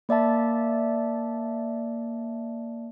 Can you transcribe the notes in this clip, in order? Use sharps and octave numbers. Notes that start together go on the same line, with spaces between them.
A#3 D5 E5 A5